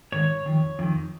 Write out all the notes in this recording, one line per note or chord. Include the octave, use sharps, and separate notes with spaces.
G#2 D#3 C#5
F2 D#3
F2 D#3